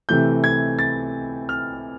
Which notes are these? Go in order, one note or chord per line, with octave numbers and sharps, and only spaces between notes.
C3 E3 A3 G6
G#6
A6
F6